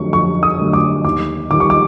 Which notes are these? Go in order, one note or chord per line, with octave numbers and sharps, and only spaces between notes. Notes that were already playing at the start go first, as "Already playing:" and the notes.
Already playing: F2 D3 F#3 A3 C#6
F2 C#6
D#6
D3 F#3 A3
D6
D#2 D6
D#3 G3 D6
C#6
D6